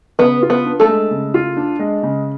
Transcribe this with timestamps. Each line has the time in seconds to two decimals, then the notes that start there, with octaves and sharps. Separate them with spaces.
0.19 C#3 B3 B4
0.42 F4
0.50 B3 B4
0.65 D4
0.80 A3 A4
0.88 G#3
1.11 C#3
1.34 F4
1.57 D4
1.79 G#3
2.03 C#3